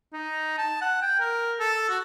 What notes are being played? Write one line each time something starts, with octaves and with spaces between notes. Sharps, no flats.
D#4
A5
F#5
G5
A#4
A4
F#4